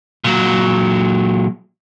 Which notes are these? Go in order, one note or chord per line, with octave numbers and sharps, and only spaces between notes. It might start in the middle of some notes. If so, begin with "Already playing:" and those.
A#2 F#3